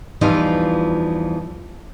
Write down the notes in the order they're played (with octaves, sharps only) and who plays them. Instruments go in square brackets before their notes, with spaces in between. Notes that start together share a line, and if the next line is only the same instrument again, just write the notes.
[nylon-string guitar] E2 E3 F3 G3 D#4 F4